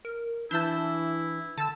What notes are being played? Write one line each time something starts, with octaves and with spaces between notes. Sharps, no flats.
A#4
E3 D4 E4 A5 E6 G6
D3 A5 E6